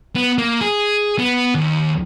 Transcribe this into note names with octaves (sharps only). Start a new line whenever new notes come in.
B3
A#3
G#4
B3
D#2